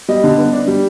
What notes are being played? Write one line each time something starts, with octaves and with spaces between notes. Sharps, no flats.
G3 D#5
D3
B3
D4
G3